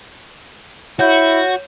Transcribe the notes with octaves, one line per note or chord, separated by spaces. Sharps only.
E4 F#4 C#5 G6